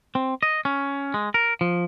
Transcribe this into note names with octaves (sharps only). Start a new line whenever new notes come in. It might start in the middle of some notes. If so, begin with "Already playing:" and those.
C4
D#5
C#4
G#3
A#4
F3